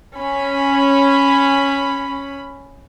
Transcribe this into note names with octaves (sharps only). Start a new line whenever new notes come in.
C#4 B5